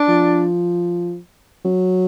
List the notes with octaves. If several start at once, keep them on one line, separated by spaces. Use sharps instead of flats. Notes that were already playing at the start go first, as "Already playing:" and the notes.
Already playing: D4
F3
F#3